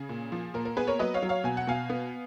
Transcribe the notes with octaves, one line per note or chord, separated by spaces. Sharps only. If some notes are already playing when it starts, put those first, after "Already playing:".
Already playing: C#3 G#4
A#2
F3
A#2 A#4
A#4
B3 G#4 B4
A#4 C#5
F#3 B4 D#5
C#5 F5
F#3
C#5 F5
B2 G#5
F#5
B2 F5 G#5
B3